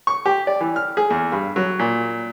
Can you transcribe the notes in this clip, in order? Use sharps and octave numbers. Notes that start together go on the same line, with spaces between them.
C#6
G4
D5
E3
F6
G#4
E2
G2
F#3
A#2